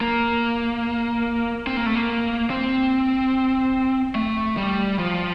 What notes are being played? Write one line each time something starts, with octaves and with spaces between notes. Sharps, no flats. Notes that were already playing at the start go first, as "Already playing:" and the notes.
A#3
C4
A#3
A3
A#3
C4
A3
G3
F3